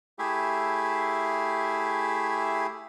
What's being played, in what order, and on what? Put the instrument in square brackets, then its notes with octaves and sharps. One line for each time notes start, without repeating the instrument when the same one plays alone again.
[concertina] A3 E4 G4 G#4 E5